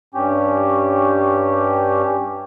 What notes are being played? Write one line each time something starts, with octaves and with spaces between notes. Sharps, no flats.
G2 C#4 G4